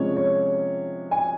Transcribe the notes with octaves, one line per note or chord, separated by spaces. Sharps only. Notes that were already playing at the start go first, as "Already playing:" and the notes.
Already playing: C3 F3 G#3 C#4 C#5
C#5
G#5